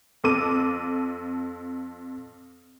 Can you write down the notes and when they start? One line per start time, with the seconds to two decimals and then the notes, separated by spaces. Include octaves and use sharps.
0.24 F2 A4 D6 D#7